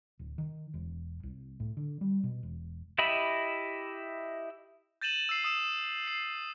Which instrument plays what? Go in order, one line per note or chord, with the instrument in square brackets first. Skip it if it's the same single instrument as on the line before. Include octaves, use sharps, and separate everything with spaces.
[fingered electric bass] D1
D#3
E1
C2
A2
D3
G3
B2
E1
[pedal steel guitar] E4 G4 D#5 E5 B5
[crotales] G6 A6 D#7 E7 F#7
E6 C7
D#6 E6 E7
C7